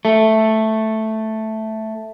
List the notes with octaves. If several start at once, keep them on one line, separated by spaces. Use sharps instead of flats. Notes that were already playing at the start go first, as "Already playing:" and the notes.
A3